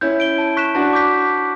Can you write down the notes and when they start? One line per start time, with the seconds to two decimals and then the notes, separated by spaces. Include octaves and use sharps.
0.01 C#4 E4 G6
0.20 D7 G7
0.38 A5
0.57 C#6 F#6 B6 E7
0.75 D4 F#4 A5
0.93 D6 G6 B6